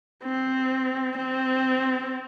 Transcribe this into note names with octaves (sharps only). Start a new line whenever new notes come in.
C4
C4